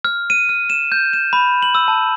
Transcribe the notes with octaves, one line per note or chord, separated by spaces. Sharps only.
F6
D#7
F6
E7
G6
E7
B5
F#7
E6
A5